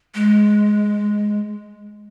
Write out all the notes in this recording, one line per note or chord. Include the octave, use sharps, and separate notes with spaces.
G#3